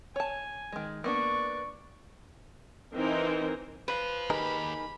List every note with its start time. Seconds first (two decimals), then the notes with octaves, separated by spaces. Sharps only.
0.16 C#5 G#5 A5
0.72 D#3 G#3
1.04 A#3 B3 D4 D5 C#6
2.94 E3 C4 D#4 A#4
3.88 B4 C5 F5
4.30 D#2 D#4 G4 G#4 A#4 B5